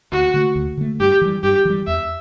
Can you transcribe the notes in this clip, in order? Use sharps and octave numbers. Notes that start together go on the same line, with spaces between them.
D2 F#4
D3 A3
D2
D3 A3
G2 G4
E3 G3
G2 G4
E3 G3
E2 E5